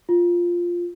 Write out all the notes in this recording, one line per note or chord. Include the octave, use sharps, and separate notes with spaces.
F4